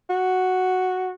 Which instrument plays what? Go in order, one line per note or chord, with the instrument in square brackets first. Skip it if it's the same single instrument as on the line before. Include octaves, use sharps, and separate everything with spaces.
[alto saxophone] F#4